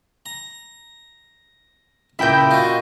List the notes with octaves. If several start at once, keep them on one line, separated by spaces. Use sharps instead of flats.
A#5
C#2 A#2 E4 E5 G5 G6
F4 F#4 D#5